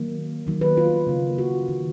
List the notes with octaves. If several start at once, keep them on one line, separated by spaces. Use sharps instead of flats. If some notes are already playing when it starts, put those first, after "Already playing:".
Already playing: D#3 F#3 A#3
D#3 F#3 A#3
B4
F4
C#3 F#3 A#3
F#4
D#3 A#3